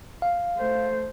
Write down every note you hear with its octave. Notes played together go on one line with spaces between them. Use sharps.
F5
A3 C5